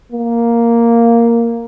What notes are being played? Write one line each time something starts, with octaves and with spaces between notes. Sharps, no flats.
A#3